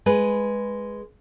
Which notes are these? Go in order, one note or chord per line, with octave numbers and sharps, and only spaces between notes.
G#3 G#4 B4